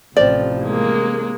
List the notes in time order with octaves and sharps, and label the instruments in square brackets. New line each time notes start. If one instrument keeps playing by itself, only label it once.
[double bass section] A1 C3 [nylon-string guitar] F3 C4 [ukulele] D5
[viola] G#3 A#3